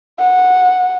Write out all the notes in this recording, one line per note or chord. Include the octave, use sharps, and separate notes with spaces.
F#5